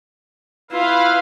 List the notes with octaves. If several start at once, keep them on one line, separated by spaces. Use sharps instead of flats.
E4 F4 B4 F5